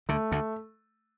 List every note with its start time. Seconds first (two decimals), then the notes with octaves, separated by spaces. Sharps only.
0.09 D2 D3 A3
0.32 D2 D3